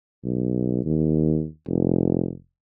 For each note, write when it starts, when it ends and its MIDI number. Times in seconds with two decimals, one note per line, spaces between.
0.24 0.80 35
0.85 1.46 39
1.68 2.32 29